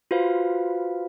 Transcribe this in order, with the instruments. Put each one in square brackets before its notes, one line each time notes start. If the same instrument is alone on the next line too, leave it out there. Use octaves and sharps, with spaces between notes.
[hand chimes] F4 F#4 B4 C5 F5